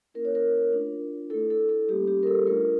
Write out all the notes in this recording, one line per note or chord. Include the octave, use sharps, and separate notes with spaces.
A#3 C#4 E4 A#4
C#5
A#4
A3 D4 F4
A3 E4 A4
A4
A4
G3 A#3 C#4 G4
G4
A#4
A4
A3 D4 F4 A#4